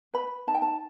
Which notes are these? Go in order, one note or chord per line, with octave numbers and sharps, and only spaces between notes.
B4 B5
D#4 A5
G5
A5